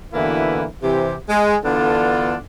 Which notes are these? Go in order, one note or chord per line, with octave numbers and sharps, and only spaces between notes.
B2 D3 E3 A#3 E4 B4
C3 E3 G4
G#3
D3 E3 B3 D4 F4 A4